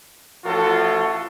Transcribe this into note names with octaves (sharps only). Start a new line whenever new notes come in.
A1 A2 F3 F4 F#4 A4